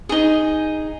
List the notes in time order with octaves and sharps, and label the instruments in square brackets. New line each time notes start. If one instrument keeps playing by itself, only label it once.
[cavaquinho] D#4 G#4